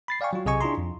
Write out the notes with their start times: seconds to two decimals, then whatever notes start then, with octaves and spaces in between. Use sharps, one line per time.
0.08 B5 A6 C7
0.21 D5 F5 G5 G#5 C#6
0.33 F#3 F4
0.45 B1 C3 G#4 D#5 G#5 C#6
0.61 D4 E4 F4 G#4 A#5 C6
0.77 F2